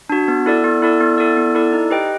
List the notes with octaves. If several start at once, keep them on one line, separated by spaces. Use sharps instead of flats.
D4 F#4
B3
E4 A4 D5
B3
E4 A4 D5
B3
E4 A4 D5
B3
E4 A4 D5
D#4
G4 B4 D#5 G5